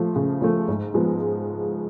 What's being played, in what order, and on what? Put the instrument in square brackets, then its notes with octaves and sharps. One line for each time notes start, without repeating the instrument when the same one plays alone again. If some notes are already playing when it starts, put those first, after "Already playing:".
Already playing: [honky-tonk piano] F3 A3
C#3
F3 A3
G#2
F3 G#3 B3